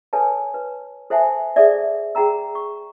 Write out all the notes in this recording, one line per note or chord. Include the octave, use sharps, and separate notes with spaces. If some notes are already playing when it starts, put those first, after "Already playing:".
A4 B4 C#5 G#5 A5
B4
A4 C5 E5 F#5 G#5 A5
G#4 A4 C5 D5 E5
G#4 F#5 G5 A#5 E6
C#6